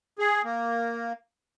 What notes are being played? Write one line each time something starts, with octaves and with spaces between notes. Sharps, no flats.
G#4
A#3